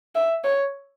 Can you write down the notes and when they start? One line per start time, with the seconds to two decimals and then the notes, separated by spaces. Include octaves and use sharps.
0.15 E5
0.44 C#5